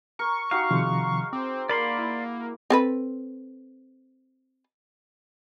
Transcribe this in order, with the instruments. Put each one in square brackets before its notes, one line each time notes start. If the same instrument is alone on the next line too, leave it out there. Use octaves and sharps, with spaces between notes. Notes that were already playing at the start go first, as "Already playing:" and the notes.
[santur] A#4 [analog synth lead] C#6
[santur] D#4 F#4 G4 [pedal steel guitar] F5
[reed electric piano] C3 D#3 F3 [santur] G#3
[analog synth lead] C4 [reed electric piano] D6
[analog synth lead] A#3 [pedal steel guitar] D5 B5 C6
[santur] E4
[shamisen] C4 A4 B4